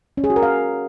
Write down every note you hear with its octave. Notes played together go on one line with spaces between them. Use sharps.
C#4
G#4
F#4
A#4
F5